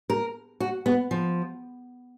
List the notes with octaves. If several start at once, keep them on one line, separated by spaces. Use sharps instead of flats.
A#4
F#4
B3
F3